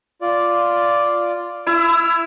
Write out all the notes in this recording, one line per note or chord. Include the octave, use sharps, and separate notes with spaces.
F4 D5
E4 E6 F6